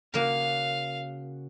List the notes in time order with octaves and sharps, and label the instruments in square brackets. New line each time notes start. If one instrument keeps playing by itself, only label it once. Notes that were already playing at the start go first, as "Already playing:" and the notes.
[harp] C#3 F#4 [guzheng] A#3 A#4 [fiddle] F5